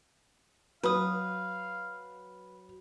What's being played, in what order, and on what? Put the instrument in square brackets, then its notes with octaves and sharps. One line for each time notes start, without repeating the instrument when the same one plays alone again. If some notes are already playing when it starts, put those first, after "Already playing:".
[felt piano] F#3 [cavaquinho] B4 D#6 [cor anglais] F5